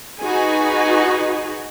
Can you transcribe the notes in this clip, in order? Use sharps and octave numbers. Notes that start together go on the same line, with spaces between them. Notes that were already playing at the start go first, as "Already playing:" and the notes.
D#4 F#4 G#4 B4 G#5